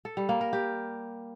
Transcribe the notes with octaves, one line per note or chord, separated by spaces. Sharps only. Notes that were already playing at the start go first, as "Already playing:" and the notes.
A4
G3
A#3
A#4
G4